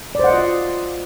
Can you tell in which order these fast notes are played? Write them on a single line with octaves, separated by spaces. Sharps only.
D5 C5 F#5 D#5 F4